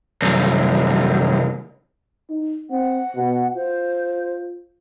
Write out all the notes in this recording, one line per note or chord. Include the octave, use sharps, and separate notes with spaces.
C2 F#2
D#4
C4 F#5
B2
F4 C5